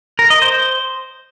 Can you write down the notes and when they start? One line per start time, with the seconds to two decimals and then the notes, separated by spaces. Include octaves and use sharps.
0.19 A#4
0.30 D#5
0.42 C5